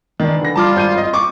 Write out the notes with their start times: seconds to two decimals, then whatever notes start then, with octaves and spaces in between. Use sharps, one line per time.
0.20 D#3 E3 D4
0.42 D3 A#6
0.56 G3 F4 A5 D6 F6
0.76 G#1 G6 D#7
0.98 D#5
1.13 C4 C#6 D6